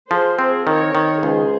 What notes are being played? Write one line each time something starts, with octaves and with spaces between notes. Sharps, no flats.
F3 G#4 C5
C4 G#4 C5
D#3 A#4 C#5
D#3
C#2 G#4 C5